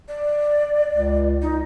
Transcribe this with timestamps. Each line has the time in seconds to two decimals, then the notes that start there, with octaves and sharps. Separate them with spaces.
0.08 D5
0.91 C#2
1.42 D#4